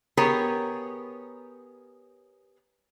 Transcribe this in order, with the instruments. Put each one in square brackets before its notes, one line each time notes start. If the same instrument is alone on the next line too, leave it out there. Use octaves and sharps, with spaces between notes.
[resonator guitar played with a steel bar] B3 G4 G#4 A#4 C#5